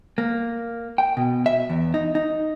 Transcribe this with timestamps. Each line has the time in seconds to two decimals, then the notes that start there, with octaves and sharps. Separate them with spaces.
0.18 A#3
0.98 G5
1.17 B2
1.46 E5
1.70 E2
1.94 D#4
2.15 D#4